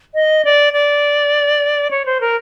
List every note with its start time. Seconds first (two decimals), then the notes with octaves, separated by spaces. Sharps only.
0.14 D#5
0.45 D5
0.73 D5
1.91 C#5
2.06 C5
2.21 A#4